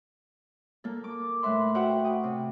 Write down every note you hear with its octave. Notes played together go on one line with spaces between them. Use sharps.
A#3 A4
D6
A2 A3 B4 E5 C6
F#4 G4 C5 E5 F#5 G5
G5 D#6
C3